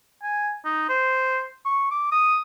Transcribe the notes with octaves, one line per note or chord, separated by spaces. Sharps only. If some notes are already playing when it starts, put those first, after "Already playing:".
G#5
D#4
C5
C#6
D6
D#6